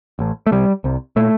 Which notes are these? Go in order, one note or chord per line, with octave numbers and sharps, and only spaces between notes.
A1 A2
A3
C2 C3 G3
C2 C3
A#2 A3